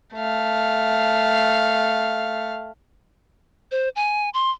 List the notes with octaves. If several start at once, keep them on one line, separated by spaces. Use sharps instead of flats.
A3 F5
C5
G#5
C6